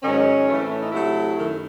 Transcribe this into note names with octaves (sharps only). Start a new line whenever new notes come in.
G#2 D#3 F#3 C#4
A2 E3 A3
C4
C#4
D#4
C3 F#3 A3 E4
F#2 D#3 A3